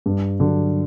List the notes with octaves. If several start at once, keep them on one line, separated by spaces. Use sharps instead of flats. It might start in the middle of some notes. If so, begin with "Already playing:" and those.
G2
D3 F#3